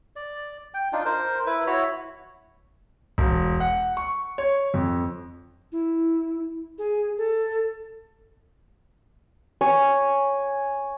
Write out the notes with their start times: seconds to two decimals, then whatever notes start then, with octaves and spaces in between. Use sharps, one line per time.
0.16 D5
0.74 G5
0.93 D4 D#4 F4
1.05 A#4 C5
1.46 E4 B4
1.67 E4 F#4 C#5 B5
3.18 E1
3.60 F#5
3.97 C#6
4.38 C#5
4.74 F2
5.72 E4
6.78 G#4
7.17 A4
9.61 C#5 G#5